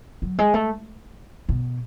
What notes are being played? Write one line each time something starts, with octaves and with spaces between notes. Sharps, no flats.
F#3
G#3
A3
B2